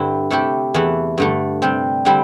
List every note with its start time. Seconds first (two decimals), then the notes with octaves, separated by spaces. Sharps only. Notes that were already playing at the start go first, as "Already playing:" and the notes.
Already playing: G2 D3 C4 E4
0.30 C3 A3 E4 G4
0.74 E2 E3 A3 E4
1.18 G2 D3 A3
1.62 C3 G3 C4
2.05 D3 G3 C4 E4